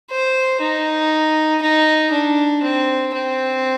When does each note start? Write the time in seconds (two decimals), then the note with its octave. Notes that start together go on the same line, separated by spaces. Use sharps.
0.10 C5
0.61 D#4
1.62 D#4
2.12 D4
2.63 C4
3.14 C4